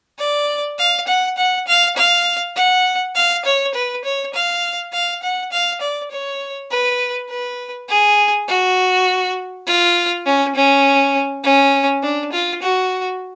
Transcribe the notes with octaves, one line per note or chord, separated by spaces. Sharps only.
D5
F5
F#5
F#5
F5
F5
F#5
F5
C#5
B4
C#5
F5
F5
F#5
F5
D5
C#5
B4
B4
G#4
F#4
F4
C#4
C#4
C#4
D4
F4
F#4